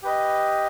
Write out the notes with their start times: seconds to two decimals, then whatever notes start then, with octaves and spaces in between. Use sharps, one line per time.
0.02 G4 B4 D#5